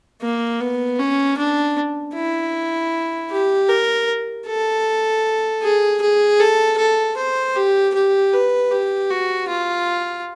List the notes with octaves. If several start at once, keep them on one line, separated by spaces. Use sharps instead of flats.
A#3
B3
C#4
D4
E4
G4
A#4
A4
G#4
G#4
A4
A4
C5
G4
G4
B4
G4
F#4
F4